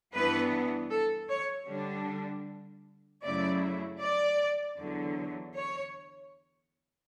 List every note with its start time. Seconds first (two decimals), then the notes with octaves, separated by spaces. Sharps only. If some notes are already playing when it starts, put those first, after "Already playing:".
0.13 G2 E3 B3 D4 B4
0.90 A4
1.29 C#5
1.68 D3 G3 D4
3.23 F#2 C#3 F#3 A3 E4 D5
4.01 D5
4.78 E2 D3 F#3
5.56 C#5